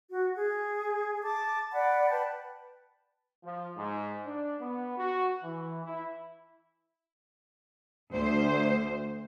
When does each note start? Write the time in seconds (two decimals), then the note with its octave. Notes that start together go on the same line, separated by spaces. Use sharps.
0.10 F#4
0.36 G#4
1.22 A5 D6
1.72 D5 F#5 B5
2.10 B4 G5 A5
3.44 F3
3.76 G#2
4.25 D4
4.60 B3
4.97 F#4
5.43 E3
5.84 E4
8.13 D2 C5